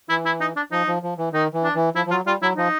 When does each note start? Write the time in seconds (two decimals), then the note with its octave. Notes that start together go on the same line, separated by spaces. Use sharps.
0.09 E3 E4
0.26 E4
0.41 D#4
0.56 D4
0.72 F3 D#4
0.88 F3
1.03 F3
1.18 E3
1.33 D#3 D#4
1.54 E3
1.64 D4
1.75 E3
1.95 F3 E4
2.06 F3
2.10 F#3 F4
2.26 G3 F4
2.42 F#3 E4
2.57 F3 D#4